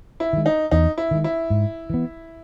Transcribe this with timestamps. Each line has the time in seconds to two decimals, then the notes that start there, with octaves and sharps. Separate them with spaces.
0.20 E4
0.33 D#3 G#3
0.46 D#4
0.71 E2 D#4
0.98 E4
1.11 D#3 G#3
1.24 E4
1.50 G#2
1.90 E3 B3